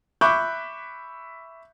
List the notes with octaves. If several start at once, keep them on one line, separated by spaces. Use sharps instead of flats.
E5 B5 C#6 D6 F#6 G6